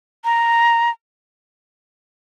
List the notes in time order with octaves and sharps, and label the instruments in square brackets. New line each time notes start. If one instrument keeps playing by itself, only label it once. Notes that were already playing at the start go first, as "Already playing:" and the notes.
[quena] A#5